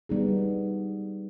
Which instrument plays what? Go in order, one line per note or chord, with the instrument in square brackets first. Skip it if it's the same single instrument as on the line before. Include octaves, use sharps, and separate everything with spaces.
[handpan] G3 B3 D#4 G#4